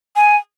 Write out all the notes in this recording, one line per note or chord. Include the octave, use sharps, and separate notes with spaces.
G#5